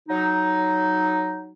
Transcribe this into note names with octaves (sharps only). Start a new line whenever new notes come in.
F#3 D#4